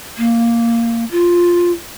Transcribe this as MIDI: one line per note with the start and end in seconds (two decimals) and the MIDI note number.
0.18 1.05 58
1.11 1.71 65